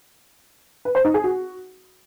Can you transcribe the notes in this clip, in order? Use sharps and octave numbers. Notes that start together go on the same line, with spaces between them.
B4
C5
D#4
G#4
F#4